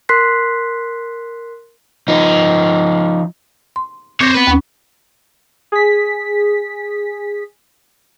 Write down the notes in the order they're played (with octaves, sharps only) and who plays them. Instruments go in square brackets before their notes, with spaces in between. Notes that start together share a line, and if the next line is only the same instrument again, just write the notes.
[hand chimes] A#4 C6 F#6 B6 C7
[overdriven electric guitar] F3 D#4
[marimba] C6
[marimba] C4 D6 A#6 [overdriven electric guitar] C5 C#5
[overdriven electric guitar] B3 B4
[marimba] D#2 C#4
[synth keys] G#4 B6